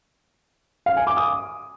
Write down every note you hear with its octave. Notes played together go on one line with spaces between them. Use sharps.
F5
G#5
D6
D#6